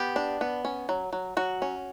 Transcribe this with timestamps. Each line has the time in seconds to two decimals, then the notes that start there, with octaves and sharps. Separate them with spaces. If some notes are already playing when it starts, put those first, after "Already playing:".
Already playing: B3 G4
0.16 D4
0.41 B3
0.65 C#4
0.89 F#3
1.13 F#3
1.37 F#3 F#4
1.62 C#4